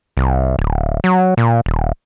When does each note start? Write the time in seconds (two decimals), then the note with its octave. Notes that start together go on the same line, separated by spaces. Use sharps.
0.17 C2
0.59 D1
1.04 F#3
1.37 A#2
1.66 D#1